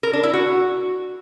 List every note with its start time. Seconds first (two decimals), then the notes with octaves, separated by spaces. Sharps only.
0.03 A#4
0.13 D4
0.23 E4
0.33 F#4